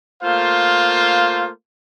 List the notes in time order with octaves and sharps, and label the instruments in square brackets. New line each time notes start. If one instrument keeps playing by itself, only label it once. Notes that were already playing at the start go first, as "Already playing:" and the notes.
[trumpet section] A3 A#3 F4 C5 F5